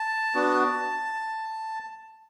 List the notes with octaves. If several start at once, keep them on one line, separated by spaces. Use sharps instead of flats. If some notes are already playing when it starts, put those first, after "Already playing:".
Already playing: A5
B3 D4 F#4